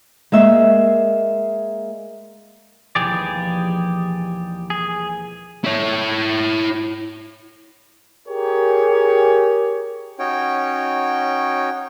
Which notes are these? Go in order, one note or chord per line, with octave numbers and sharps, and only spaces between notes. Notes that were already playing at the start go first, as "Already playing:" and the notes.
G#3 A#3 E5
E1 D#2 F3 G4 G#4 D5
G#4
E4 C#5
G4 G#4 A#4 C#5
C#4 D#4 F#4 C#5 G5